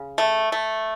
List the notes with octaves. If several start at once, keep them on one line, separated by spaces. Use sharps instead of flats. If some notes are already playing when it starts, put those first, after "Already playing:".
Already playing: C#3
A3
A3